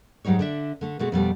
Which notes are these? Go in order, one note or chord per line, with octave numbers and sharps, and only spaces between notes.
G#2 F#3 G3 D#4 C#5
D3 D4 E5
D3 A3
B2 G#3 A3 F#4
F2 B2 G3 A3